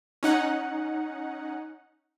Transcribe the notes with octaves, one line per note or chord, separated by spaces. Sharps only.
C#4 D#4 F#5